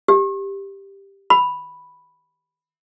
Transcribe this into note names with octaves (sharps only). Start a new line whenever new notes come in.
G4
B5